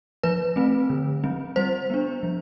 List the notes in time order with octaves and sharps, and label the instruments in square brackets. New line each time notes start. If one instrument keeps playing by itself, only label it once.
[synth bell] F3 B4
A3 C4
D3
F3 C4
G3 C5
B3 D4
F3